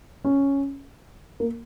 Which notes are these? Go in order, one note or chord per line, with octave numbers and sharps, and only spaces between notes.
C#4
A#3